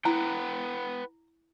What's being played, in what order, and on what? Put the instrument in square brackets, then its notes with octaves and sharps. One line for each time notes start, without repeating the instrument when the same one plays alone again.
[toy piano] E4 [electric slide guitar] B4 F#5 G5 [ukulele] A#5